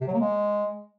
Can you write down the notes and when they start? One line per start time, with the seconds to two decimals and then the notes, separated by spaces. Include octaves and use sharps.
0.01 C3
0.07 F#3
0.14 A#3
0.20 G#3